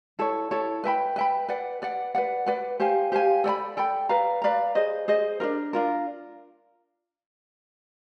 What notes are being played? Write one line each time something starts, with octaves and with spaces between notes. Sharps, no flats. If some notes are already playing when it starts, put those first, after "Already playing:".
E4 A4 C#5
E4 A4 C#5
B4 E5 G5 B5
B4 E5 G5 B5
B4 D5 F#5
B4 D5 F#5
B4 D5 F#5
B4 D5 F#5
G4 C5 F5 G#5
G4 C5 F5 G#5
A4 D5 G5 B5
A4 D5 G5 B5
B4 D5 F5 A#5
B4 D5 F5 A#5
G#4 C5 D#5
G#4 C5 D#5
D4 F4 A#4
D4 F4 A#4